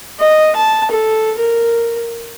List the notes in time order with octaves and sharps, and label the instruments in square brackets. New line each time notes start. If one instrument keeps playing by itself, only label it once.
[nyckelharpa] D#5
A5
A4
A#4